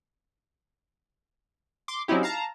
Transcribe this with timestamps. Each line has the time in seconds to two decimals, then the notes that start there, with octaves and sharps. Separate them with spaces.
1.88 C6 D6
2.08 F#3 C4 C#4 D#4 E4 G4
2.23 F5 A5 A#5